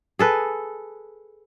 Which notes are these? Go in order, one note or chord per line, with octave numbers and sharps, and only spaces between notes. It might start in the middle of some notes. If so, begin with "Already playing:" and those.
G#4 A4 B4